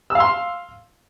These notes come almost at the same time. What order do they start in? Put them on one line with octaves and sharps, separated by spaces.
E6 F5 C6